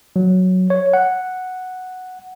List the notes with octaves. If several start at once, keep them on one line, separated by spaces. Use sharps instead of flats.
F#3
C#5
F#5